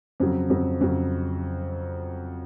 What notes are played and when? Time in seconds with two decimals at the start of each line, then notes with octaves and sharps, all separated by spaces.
0.20 F2 C#3 F#3
0.50 F2 C#3 F#3
0.81 F2 C#3 F#3